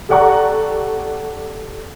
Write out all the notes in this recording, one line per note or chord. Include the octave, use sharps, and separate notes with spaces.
G4 A4 D5 F#5 A#5 C#6